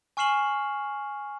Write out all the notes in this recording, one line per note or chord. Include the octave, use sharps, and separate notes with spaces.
G#5 C#6 F6 C7 E7 F#7